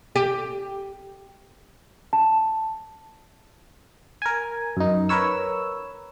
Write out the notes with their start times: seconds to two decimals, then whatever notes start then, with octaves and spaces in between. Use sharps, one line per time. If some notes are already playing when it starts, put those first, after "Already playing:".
0.16 G4
2.13 A5
4.22 A#4 G#5
4.77 F#2 D#4
5.09 A#4 B4 C#5 E6